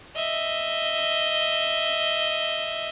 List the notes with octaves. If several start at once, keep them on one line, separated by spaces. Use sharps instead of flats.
D#5 E5